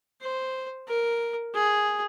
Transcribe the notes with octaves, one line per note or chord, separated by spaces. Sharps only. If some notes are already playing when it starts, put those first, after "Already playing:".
C5
A#4
G#4